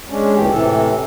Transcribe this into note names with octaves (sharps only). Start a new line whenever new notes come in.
G#3 C#4 D4
D2 A#2 E3 G4
A2 C3 E3 A4